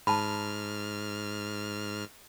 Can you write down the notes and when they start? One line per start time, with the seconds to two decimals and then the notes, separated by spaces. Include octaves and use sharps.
0.07 G#2 A5 B5 F6